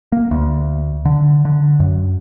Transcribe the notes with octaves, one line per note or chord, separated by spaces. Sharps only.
A#3
D2
D3
D3
F#2